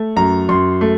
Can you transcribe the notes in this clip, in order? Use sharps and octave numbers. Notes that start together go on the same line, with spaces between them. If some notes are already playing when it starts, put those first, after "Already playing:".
Already playing: A3
F#2 A#5
F#2 C6
A3